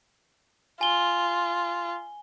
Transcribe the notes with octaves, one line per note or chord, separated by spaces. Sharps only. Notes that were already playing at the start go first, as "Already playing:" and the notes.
F4 G#5 G7